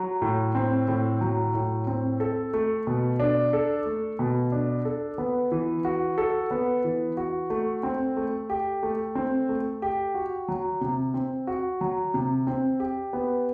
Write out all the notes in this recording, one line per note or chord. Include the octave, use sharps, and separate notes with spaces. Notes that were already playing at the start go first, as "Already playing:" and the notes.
Already playing: F#3
A2
C4
A2
F#3
A2
C4
A4
A3
B2
D4
A4
A3
B2
D4
A4
B3
E3
F#4
A4
B3
E3
F#4
A3
C4
A3
G4
A3
C4
A3
G4
F#4
F#3
C3
C4
F#4
F#3
C3
C4
G4
B3